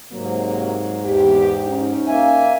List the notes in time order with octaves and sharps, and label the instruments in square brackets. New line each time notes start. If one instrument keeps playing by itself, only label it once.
[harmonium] G#2 [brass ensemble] C3 F#3 A#3
[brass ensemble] E2 G4
C#4 D#4
[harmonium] A#3 E5 G#5